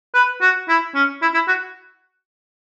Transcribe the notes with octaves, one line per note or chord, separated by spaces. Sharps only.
B4
F#4
E4
C#4
E4
E4
F#4